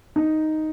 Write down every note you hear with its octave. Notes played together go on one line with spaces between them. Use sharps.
D#4